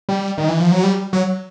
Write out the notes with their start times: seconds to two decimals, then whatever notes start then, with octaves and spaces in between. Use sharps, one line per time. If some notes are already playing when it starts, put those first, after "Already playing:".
0.09 G3
0.38 D#3
0.48 E3
0.60 F3
0.72 F#3
0.83 G3
1.13 F#3